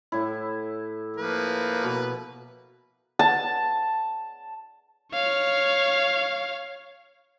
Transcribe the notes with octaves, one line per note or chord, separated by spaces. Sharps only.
A2 E4
F3 A#3 B4
B2
A5
C#5 F5